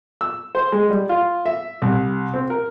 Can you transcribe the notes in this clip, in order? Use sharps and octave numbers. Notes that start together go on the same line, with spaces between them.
E6
C5
G#3
G3
F4
E5
C2
C4
A#4